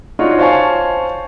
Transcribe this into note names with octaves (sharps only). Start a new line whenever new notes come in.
D4 D#4 F4 F#4 C#5
C5 C#5 F5 G#5 A5 C#6